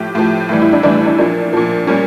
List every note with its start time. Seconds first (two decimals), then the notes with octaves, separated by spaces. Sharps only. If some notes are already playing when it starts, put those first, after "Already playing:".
Already playing: A2 F3 G4
0.15 A2 F3
0.49 A2 E3 G3
0.62 E4
0.72 D4
0.83 A2 E3 G3 D4
0.95 E4
1.06 D4
1.18 A#2 F3 D4
1.53 A#2 F3
1.87 A#2 G3 C#4